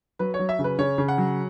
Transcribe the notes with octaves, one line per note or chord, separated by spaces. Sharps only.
F#3 B4
C#5
F#3
E5
C#3
B4
C#3 C#5
C#3
F#5
F#3